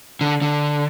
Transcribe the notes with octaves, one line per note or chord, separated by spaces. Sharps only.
D3
D3